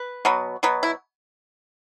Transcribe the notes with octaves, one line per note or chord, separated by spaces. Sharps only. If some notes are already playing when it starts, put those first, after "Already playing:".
Already playing: B4
B2 F#3 B3
B2 F#3 B3
E4